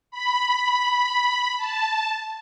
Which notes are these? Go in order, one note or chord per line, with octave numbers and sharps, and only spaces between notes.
B5
A5